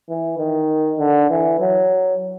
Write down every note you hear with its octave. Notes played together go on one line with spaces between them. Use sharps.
E3
D#3
D3
E3
F#3